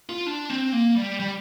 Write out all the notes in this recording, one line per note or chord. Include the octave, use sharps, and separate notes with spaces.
F4
D4
C4
A#3
G3
G3